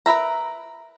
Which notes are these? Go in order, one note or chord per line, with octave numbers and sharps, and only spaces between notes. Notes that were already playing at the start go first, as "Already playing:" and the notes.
A#4 B4 E5 A#5